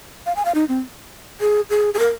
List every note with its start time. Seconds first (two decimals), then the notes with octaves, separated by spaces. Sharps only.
0.26 F5
0.36 G#5
0.45 F5
0.55 D#4
0.69 C4
1.41 G#4
1.70 G#4
1.94 G#4
1.99 A#4